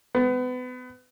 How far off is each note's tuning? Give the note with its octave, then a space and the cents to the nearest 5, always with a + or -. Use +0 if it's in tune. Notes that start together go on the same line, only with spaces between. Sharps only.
B3 +30